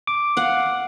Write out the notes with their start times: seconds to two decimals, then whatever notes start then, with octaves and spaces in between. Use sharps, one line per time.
0.07 D6
0.37 F5 F#5